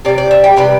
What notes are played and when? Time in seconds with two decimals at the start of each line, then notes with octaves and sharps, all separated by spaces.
0.05 C3 G3 D5
0.18 D5
0.31 E5
0.44 G5
0.57 C3 G3 B4